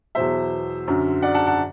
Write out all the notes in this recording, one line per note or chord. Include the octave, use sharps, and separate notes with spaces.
E2 B2 F#3 C5 E5
F#2 D3 F#3
D5 F#5
F#5 A5
F#5 A5